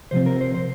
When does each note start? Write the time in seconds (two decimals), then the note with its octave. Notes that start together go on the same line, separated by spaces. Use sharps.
0.11 C3 F3 C4 C5
0.26 A#4
0.41 C5
0.54 C5